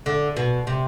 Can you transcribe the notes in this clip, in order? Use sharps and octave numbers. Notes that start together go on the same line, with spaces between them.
D3
B2
C3